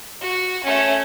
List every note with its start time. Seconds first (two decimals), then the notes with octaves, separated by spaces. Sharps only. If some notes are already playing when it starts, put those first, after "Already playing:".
0.21 F#4
0.64 A3 C#4